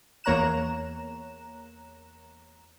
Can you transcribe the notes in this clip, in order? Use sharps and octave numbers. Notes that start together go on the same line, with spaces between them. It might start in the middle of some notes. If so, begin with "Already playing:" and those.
E2 A#3 C#5 A#5 F#6 E7